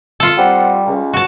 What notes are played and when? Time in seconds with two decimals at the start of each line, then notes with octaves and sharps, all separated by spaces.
0.20 F4 A4
0.38 G3 C4 F#5
0.86 C#2
1.13 F#4 A5